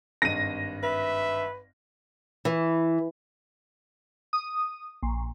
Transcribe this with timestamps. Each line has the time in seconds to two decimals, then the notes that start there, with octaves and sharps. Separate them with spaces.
0.22 G#1 G2 D#5 A#6 D#7
0.83 B4 E5
2.45 E3
4.33 D#6
5.03 A#1